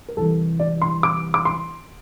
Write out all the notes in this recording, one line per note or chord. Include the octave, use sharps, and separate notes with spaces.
A#4
C2 C3 E3 A4
D5
C6
D6
D6
C6